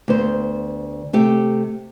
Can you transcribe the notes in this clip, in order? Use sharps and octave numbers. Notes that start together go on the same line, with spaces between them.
D2 B3 C5
C3 A3 G4